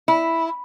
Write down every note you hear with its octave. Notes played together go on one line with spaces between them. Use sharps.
E4